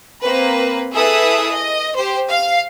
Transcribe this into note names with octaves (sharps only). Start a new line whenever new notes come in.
A#3 C4 B4
E4 G#4 A4 B4 E5 D#6
D#5
G4 C5
F5